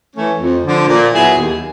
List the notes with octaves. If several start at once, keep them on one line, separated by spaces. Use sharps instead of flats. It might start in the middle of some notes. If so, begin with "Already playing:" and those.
E3 A3 C#4
F2
D3 F3
A#2
F#3 B3 E4 G#4
D#2